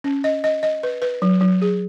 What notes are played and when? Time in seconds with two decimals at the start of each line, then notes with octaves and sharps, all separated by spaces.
0.04 C#4
0.24 D#5
0.44 D#5
0.63 D#5
0.83 B4
1.02 B4
1.22 F#3
1.41 F#3
1.62 G#4